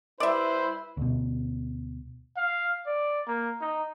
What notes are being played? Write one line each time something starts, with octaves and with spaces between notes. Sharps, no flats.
G3 E4 B4 C5 D5 E5
D2 B2
F5
D5
A#3
D#4